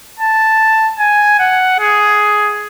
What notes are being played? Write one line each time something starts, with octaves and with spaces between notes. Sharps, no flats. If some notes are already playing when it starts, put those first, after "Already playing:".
A5
G#5
F#5
G#4